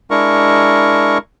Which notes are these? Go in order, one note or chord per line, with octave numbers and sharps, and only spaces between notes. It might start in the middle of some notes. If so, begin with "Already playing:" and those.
G#3 D4 E4 A#4 C#6